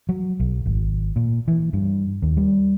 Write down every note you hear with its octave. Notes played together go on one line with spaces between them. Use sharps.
F#3
B1
G#1
A#2
E3
G2
D#2
G3